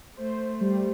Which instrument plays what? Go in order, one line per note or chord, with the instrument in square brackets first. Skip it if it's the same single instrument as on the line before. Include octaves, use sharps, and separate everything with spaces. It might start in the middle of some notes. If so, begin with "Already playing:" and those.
[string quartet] A3 [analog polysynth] C5
[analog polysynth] G3